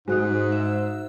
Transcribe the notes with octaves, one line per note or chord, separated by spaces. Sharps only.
G#2 G#3 D#4 F#4 C5 F#6
E5